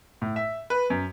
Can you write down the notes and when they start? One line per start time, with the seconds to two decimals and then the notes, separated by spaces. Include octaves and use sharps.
0.22 A2
0.36 E5
0.70 B4
0.90 F#2